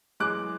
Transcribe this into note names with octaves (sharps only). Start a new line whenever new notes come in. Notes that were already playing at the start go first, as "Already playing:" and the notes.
F#2 E3 G#3 D6 F#6